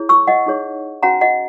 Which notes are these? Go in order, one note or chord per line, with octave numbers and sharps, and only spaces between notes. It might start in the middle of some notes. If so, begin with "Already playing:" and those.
Already playing: E4 G#4 C#5
C#6 E6
D#5 F#5
D#4 G#4 C#5
C#4 F#4 B4 F#5 A#5
D#5 F#5